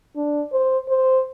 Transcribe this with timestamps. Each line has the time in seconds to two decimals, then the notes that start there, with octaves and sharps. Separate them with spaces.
0.16 D4
0.52 C5
0.89 C5